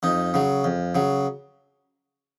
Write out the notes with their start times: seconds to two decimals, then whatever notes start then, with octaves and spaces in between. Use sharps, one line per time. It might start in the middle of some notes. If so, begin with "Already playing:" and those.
0.03 F2 D#4
0.34 C#3 F#3
0.64 F2
0.95 C#3 F#3